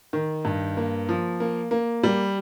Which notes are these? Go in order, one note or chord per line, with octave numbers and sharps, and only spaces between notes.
D#3
G2
A#3
F3
A#3
A#3
G3